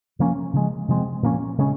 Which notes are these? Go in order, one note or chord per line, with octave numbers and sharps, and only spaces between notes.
C3 F3 A#3 C#4
C#3 F3 G#3
C3 F3 G#3 C4
A#2 F3 A#3 C#4
C#3 G#3 C#4